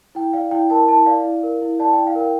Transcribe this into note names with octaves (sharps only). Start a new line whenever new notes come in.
E4 G5
D5 F5
E4 G5
A#4 A5
E4 A5
D5 F5
E4
A#4
E4
D5 A5
G5
E4
F5
A#4
G5